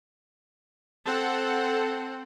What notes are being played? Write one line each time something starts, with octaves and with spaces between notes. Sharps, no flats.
C4 A4 F#5